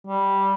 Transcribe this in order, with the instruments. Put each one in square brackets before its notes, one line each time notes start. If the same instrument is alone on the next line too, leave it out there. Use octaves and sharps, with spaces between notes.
[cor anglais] G3